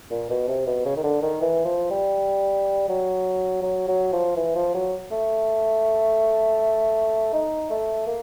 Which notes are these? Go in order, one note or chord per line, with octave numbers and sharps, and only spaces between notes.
A#2
B2
C3
B2
C#3
D#3
D3
D#3
E3
F3
G3
F#3
F#3
F#3
F3
E3
F3
F#3
A3
D#4
A3
A#3